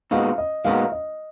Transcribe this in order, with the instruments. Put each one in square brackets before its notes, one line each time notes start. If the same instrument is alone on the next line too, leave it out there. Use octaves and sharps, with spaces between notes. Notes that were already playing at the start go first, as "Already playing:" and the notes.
[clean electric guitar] A#2 G#3 B3 D#4 F#4 [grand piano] F5
[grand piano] D#5
[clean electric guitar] A#2 G#3 B3 D#4 F#4 [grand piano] F5
[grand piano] D#5